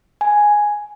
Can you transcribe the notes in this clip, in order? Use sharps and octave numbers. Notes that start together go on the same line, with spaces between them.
G#5